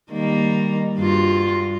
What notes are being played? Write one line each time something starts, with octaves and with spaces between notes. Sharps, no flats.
D#3 G3 A#3
G2 F4 F#4